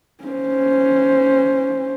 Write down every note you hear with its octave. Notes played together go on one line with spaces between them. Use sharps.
C#4 C5